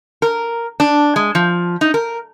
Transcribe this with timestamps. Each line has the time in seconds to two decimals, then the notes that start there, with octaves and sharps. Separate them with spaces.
0.22 A#4
0.80 D4
1.16 G#3
1.35 F3
1.81 D#4
1.94 A#4